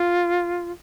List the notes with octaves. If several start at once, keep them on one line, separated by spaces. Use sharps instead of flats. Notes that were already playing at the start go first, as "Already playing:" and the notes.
Already playing: F4